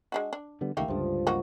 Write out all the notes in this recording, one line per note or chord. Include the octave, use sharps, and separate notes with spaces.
G#3 D4 F#4
D4
D3 G3 B3
C#2 D#3 A3 A#3 G4
C#2 G2 D3 F3
A#3 D#4 F#4